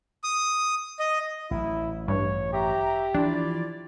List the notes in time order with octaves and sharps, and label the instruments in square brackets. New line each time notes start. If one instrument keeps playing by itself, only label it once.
[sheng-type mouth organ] D#6
D#5
[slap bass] A1 F#3 [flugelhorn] E4
[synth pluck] G2 [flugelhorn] C#5
[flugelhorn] G4 [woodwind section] E5 A#5
[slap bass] E3 F3 [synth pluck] D4 [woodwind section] E4 F4 D5